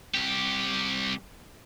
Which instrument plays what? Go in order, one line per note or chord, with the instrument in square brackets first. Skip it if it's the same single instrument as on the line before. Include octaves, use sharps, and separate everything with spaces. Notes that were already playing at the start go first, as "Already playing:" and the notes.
[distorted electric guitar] C2 G4